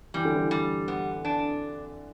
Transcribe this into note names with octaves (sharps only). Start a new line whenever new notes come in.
E3 G3
D3
E3
G3
B3
D4